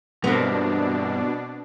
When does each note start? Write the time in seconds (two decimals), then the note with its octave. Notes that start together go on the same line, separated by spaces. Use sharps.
0.24 G2 B2 E3 B3 C4 D4 A#4